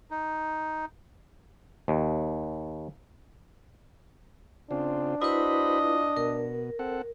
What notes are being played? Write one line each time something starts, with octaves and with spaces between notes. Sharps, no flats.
D#4
D#2
C#3 C4 D4 F4
E4 F#4 B4 C5 D#5 B5
F4
B2 A#4
C4 A4 F#5